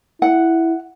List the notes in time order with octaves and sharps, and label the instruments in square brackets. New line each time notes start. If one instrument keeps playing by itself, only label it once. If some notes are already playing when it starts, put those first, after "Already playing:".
[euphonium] E4 [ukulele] F#5